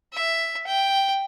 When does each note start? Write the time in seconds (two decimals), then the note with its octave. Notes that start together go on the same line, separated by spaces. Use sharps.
0.13 E5
0.67 G5